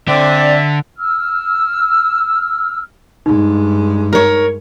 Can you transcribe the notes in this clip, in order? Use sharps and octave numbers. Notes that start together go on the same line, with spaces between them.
D3 C4 D5 E5
E6 F6
G2 G#3 D#4
A#4 C#5